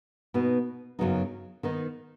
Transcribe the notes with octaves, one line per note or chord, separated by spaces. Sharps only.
B2 B3 D#4
F#2 C#3 F#3 B3 D#4
D#3 B3 D#4